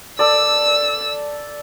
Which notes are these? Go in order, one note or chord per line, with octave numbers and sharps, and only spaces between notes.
A4 D5 E6